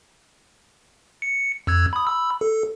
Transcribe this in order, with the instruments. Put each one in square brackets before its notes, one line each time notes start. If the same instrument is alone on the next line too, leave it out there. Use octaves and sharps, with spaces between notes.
[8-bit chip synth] C#7
F2 E6 G#6
B5 D#6
B5 E6
A4